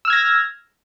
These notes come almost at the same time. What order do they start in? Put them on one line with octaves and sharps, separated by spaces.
E6 F6 G#6 A#6